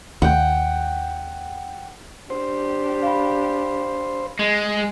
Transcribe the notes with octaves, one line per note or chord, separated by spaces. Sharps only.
D#2 F#5 G5
D4 G4 C5
F5 B5
G#3